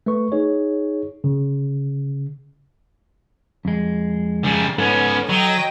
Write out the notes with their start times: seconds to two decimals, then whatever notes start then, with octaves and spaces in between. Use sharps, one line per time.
0.06 A3 B4 C#6
0.32 D#4 G#4 C#5
1.24 C#3
3.65 F2 G#3
4.45 C#3 G3
4.78 G#2 B3 C#4 A4 F#5
5.29 F#3 D#5 G5